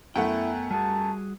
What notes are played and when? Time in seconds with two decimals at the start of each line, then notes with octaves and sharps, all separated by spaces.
0.16 F#2 A3 B3 E4 F#5 G5
0.71 G3 F#4 G#4 A5